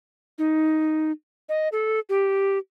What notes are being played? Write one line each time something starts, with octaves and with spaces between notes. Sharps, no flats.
D#4
D#5
A4
G4